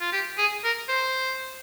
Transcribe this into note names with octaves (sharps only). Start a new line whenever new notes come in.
F4
G4
G#4
A#4
C5